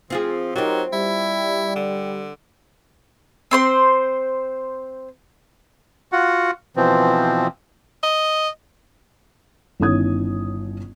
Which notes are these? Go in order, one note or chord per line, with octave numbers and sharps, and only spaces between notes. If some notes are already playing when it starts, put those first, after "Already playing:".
F3 C4 F4 G#4
F#3 C4 D#4 F4 G4 A#4
G3 E4
D3
C4 C5 C6
F4 F#4 F#5
B2 E3 F3 C4
D#5
G1 D#3 C#4 E4 D#6 G#6